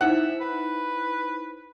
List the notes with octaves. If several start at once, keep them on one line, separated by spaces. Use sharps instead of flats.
D#4 E4 C5 E5 F#5
B4